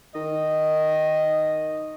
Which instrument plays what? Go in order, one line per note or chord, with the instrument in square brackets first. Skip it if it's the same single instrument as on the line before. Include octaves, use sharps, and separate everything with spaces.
[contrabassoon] D#3 [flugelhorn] D#5